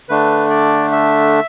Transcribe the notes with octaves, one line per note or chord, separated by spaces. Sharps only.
D3 A3 D4 B4
D5
E5